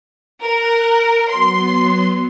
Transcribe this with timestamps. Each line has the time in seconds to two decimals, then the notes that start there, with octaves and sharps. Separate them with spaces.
0.41 A#4 F#6
1.30 F#3 B3 C6